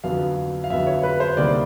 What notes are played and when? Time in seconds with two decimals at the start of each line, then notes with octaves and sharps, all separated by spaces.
0.04 F2 D3 F#3 B3 F5
0.64 F5
0.70 F2 D3 F#3 B3 E5
0.87 C#5
1.03 B4
1.20 C5
1.37 D2 C3 D#3 G3 A#3 D5